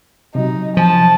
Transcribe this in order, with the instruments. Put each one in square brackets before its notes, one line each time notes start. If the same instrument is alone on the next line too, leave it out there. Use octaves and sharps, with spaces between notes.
[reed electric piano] C3 F#3 [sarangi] D#4
[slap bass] F3 [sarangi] A5